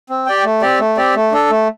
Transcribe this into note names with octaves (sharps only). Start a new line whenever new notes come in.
C4
G4 D5 G5
A3
C4 G4 D5
A3
C4 G4 D5
A3
D4 A4
A3